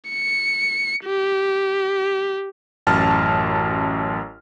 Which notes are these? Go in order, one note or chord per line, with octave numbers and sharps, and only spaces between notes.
C#7
G4
A1 F#2 A5 F6